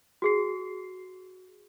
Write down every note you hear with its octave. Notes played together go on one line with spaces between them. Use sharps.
F#4 G#4 C7